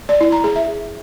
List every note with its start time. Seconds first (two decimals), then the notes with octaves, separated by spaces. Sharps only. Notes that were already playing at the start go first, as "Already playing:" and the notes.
0.09 D5
0.21 E4
0.32 A#5
0.44 G#4
0.56 E5